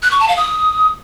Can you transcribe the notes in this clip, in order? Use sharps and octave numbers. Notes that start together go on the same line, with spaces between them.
F#6
C#6
A5
F5
D#6